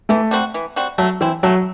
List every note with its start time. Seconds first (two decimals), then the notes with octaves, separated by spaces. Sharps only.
0.09 E3 A3
0.31 G3 C4 F#4
0.54 E3
0.76 G3 C4 F#4
0.98 F#3 A3
1.21 E3 C4 E4
1.43 F#3 A3